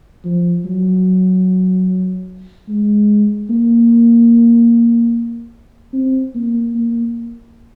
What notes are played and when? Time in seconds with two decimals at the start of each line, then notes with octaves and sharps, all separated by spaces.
0.25 F3
0.65 F#3
2.69 G#3
3.50 A#3
5.93 C4
6.35 A#3
6.75 A#3